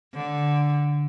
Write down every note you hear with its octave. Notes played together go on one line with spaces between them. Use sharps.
D3